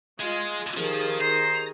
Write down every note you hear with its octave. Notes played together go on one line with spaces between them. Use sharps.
G#3 F4 D#5 G#5
D#3 F3 G4 G#4
C5 A#5